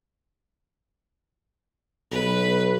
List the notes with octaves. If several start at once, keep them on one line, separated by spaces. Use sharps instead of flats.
B1 B4